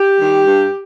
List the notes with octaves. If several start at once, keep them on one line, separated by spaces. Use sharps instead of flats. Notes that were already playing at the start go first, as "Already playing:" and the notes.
Already playing: G4
D#3 G3
G2